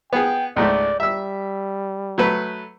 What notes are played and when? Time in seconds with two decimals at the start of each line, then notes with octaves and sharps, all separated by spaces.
0.13 B3 G#4 G5
0.56 C#2 G#2 A3 D5
1.00 G3 E5 E6
2.18 F#3 A3 B4